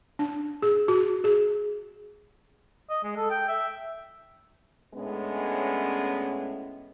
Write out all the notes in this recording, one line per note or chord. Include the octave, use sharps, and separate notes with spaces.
D4
G#4
F#4
G#4
D#5
G#3
A4
G5
E5
A2 G#3 B3 C#4 D4